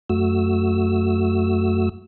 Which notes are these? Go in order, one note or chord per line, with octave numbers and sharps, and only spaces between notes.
F#2 A3 F#4 E6